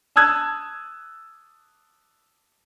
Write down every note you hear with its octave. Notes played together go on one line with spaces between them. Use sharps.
A5 D#6 E6 F#6 G#6